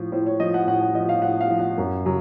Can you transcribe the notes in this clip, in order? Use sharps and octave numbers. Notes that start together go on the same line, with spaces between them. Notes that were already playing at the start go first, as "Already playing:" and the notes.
Already playing: A2 F3
A2 C5
C#5
F3 D#5
F#5
A2 F#5
F#5
F3 D#5
F5
A2 F#5
F5
F3
F#5
F#2
C#3 F#3